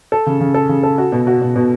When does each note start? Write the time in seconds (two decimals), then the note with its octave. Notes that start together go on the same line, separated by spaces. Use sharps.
0.12 A4
0.27 C#3
0.41 C#3
0.54 A4
0.69 C#3
0.83 A4
0.98 F#4
1.12 B2
1.27 F#4
1.41 B2
1.56 B2